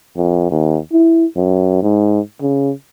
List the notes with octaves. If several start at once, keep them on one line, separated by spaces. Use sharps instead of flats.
F2
D#2
E4
F#2
G#2
C#3